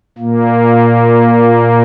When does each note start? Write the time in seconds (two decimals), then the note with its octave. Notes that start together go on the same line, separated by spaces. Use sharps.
0.18 A#2 A#3